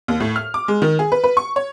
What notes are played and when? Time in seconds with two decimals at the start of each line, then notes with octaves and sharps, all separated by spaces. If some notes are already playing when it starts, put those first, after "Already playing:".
0.08 D#2
0.20 A2
0.36 F6
0.54 D6
0.68 G#3
0.82 D#3
0.99 G#4
1.12 B4
1.24 B4
1.37 C#6
1.56 C#5